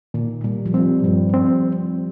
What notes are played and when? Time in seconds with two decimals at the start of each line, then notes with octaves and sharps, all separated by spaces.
0.14 A#2 D#3
0.44 A#2 G3
0.66 F3
0.74 G3 C4
1.04 G2 F3
1.34 C4